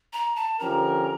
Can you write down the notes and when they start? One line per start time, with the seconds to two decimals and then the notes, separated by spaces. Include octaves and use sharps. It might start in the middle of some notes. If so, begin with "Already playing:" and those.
0.13 A#5
0.36 A5
0.59 D3 F3 C#4 G4 A#4 A#5